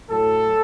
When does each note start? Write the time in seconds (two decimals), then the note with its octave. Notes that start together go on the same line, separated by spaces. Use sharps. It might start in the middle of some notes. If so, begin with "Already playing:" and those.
0.10 A2 F#3 A4